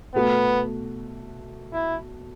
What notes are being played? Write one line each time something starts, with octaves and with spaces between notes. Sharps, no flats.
B2 A3 B3 F#4
E4